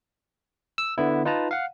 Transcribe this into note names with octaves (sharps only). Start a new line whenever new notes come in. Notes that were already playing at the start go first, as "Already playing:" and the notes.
E6
D3 B3 E4
D#4 F4 B4 A5 A#5
F5 F#5